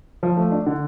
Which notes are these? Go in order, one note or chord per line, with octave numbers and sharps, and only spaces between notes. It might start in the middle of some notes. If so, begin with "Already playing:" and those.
F3
A3
D4
D3